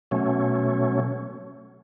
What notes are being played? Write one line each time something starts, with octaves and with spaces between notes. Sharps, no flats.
B2 F#3 A3 C#4